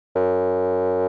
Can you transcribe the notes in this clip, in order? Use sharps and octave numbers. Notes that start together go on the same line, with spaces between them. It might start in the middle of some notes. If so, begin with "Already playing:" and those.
F#2